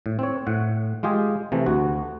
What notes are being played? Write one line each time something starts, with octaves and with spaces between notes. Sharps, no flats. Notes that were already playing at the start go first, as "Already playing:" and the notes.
A2
C4 C#5
A2 F#5
G#3 F4 G4 G#4
C3 E3 A3
D2 F#4